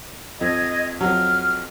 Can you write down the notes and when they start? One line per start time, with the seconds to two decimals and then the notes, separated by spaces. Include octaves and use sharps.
0.41 F2 D#5 G#6
1.01 F2 F#3 F6